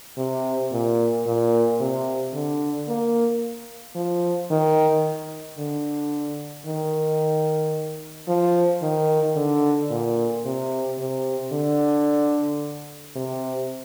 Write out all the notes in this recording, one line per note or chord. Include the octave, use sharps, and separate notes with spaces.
C3
A#2
A#2
C3
D3
A#3
F3
D#3
D3
D#3
F3
D#3
D3
A#2
C3
C3
D3
C3